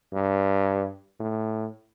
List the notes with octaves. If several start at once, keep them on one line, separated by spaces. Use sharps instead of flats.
G2
A2